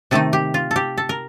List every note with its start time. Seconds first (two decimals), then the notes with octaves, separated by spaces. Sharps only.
0.11 C3 D#3 A3 D#4 A4
0.33 G4
0.54 F4
0.71 A4
0.76 G4
0.98 A4
1.09 A#4